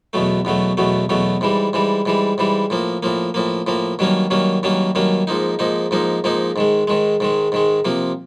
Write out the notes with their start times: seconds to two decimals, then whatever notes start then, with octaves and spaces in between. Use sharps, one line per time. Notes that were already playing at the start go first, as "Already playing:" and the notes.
0.13 E2 B2 F#3 A3
0.45 E2 B2 F#3 A3
0.77 E2 B2 F#3 A3
1.09 E2 B2 F#3 A3
1.41 G#2 E3 G3
1.73 G#2 E3 G3
2.06 G#2 E3 G3
2.38 G#2 E3 G3
2.70 A2 F3 A#3
3.03 A2 F3 A#3
3.34 A2 F3 A#3
3.67 A2 F3 A#3
3.99 G2 D#3 F#3 A#3 C#4
4.31 G2 D#3 F#3 A#3 C#4
4.63 G2 D#3 F#3 A#3 C#4
4.95 G2 D#3 F#3 A#3 C#4
5.27 G#2 F3 A#3 D#4
5.59 G#2 F3 A#3 D#4
5.91 G#2 F3 A#3 D#4
6.24 G#2 F3 A#3 D#4
6.56 G#2 D#3 G#3
6.87 G#2 D#3 G#3
7.20 G#2 D#3 G#3
7.52 G#2 D#3 G#3
7.85 C3 F3 A#3